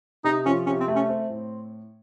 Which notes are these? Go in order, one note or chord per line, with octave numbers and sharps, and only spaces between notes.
C3 D#4
F3 C#4
C3 C#4
C4
A3
C#4
C4
A2